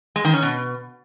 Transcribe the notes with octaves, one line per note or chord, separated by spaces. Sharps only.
G#3
D#3
C#4
B2